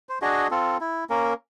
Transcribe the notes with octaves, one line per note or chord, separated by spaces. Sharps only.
C5
D4 F#4 G#4 D#5
C4 F4 A4
E4
A#3 C#4 A#4